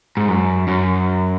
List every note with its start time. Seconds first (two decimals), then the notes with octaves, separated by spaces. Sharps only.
0.17 G#2
0.29 F#2
0.68 F#2